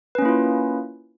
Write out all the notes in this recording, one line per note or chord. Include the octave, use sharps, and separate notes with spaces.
A#3 C#4 E4 F4 B4